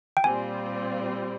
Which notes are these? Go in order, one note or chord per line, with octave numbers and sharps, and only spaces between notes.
G5
A#2 G3 C4 F4 G#5